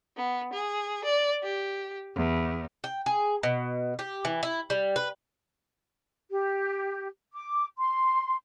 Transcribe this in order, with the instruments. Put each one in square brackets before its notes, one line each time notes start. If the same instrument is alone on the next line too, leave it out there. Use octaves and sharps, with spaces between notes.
[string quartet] B3
G#4
D5
G4
E2
[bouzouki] G5
G#4
B2
G4
E3
E4
G3
B4
[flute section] G4
D6
C6